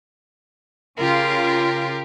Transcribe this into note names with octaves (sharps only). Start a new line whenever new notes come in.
C#3 F4 G4 A#4